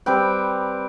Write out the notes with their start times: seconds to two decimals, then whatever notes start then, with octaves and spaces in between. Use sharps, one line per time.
0.06 G3 C4 B4 G5